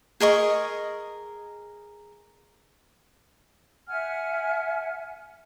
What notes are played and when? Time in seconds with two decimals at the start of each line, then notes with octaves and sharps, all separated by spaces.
0.20 G#4 A#4 D#5 C#6
3.88 E5 F#5 G#5 F6